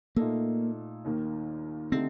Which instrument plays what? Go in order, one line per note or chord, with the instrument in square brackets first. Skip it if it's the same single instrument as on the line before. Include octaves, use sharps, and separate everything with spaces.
[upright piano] A#2 A3 D#4 A4 [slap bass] A#3
[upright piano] D#2 D#3 A#3
[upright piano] D3 A3 D#4 G4 [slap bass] C4